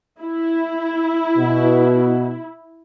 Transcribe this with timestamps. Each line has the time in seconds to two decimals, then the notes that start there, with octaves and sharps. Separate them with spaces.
0.21 E4
1.37 B2